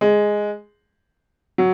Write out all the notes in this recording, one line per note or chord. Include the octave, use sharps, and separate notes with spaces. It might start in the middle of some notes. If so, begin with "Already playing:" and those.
G#3
F#3